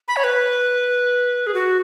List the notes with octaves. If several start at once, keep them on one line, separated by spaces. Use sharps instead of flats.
B5
C#5
B4
G#4
F#4